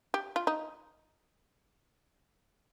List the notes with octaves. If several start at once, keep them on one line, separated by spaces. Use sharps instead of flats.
G4
F4
D#4